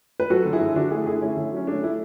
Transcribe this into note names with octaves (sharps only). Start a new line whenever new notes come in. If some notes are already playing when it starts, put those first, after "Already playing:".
B4
F#3 F#4 A4
D3
E4 G#4
D3
D3 D4 F#4
A3 E4 G#4
D3 E4 G#4
A3 C#4 E4
D3
F#3 C#4
A3 D4
A3 E4